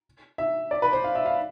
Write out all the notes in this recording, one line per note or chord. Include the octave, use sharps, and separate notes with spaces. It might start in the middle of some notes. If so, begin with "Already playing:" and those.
E5
D5
B4
C5
F5
E5
F5